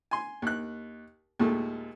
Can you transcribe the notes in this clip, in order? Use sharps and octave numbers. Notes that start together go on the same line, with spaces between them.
G#5 C6
D#2 F#6
D#2 A#2 G#3 A3